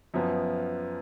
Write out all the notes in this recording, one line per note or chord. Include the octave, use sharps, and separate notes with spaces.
F#2 F3 B3